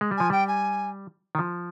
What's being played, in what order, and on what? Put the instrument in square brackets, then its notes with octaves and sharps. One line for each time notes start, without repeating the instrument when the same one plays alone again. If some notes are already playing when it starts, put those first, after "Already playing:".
[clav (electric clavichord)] G#3
G3
[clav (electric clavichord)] F3 [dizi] G#5
[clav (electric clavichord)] G3 [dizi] G5
[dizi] G#5
[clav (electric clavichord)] D#3
F3